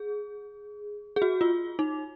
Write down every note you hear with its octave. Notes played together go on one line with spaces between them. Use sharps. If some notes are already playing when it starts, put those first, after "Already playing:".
Already playing: G#4
G#4
F#4
F4
D#4